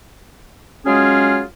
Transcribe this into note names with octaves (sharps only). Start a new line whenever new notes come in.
F#3 G#3 C#4 F4 G#4